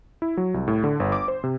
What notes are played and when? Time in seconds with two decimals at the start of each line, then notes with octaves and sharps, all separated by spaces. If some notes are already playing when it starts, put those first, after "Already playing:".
0.22 E4
0.37 F#3
0.54 C2
0.68 A2
0.84 D3
1.00 G1
1.12 D6
1.28 C5
1.44 C3